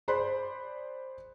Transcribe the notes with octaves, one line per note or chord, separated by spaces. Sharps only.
G#4 C5 D5 B5 C6 F#6